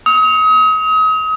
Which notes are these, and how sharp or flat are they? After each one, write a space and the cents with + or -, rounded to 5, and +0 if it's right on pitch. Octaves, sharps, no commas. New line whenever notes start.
D#6 +35